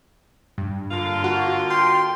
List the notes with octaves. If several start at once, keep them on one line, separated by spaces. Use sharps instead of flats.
G2
D3 A#3 F4
F#4
G5 C6